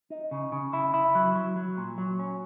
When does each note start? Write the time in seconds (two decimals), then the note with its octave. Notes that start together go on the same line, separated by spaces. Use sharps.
0.10 D#4
0.31 C#3
0.52 C#3
0.73 E4
0.94 E4
1.15 F#3
1.35 F#3
1.56 F#3
1.77 A#2
1.98 F#3
2.19 C#4